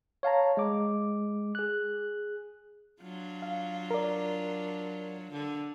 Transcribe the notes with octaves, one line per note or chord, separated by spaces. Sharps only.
C#5 F5 A5 A#5
G#3 D6
G#4 F#6
F#3 D4 F4
F5
A#4 D5
D3